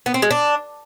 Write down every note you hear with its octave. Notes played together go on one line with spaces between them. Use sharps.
B3
C4
G#3
D4